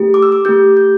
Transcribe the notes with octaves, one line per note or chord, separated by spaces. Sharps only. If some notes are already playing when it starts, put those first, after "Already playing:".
Already playing: A3 G4
D6
E6
D6
A3 G4 G6
G6